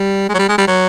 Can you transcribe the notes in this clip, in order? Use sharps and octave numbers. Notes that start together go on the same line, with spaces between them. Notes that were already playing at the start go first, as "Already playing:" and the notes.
Already playing: G3
G#3
F#3
G3
G#3
G3
F#3